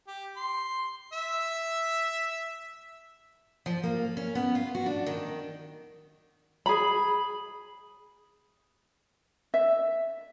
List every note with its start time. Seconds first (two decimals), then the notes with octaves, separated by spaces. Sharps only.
0.07 G4
0.36 C6
1.13 E5 E6
3.66 F3
3.83 A#3
4.17 C#4
4.35 B3
4.55 F4
4.75 F#4
4.86 D4
5.06 D#3
6.66 G#4 B5
9.54 E5